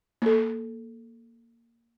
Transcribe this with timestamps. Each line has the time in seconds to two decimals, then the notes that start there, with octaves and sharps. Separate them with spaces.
0.22 A#3 A4